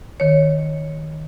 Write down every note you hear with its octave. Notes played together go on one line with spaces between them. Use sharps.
D#3 C#5